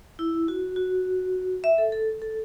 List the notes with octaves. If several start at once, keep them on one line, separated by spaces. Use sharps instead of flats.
E4
F#4
F#4
E5
A4
A4
A4